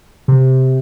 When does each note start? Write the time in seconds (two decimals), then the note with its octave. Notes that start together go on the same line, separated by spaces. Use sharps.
0.28 C3